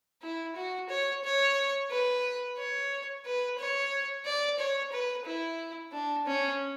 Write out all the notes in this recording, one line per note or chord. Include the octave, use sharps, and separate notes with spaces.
E4
F#4
C#5
C#5
B4
C#5
B4
C#5
D5
C#5
B4
E4
D4
C#4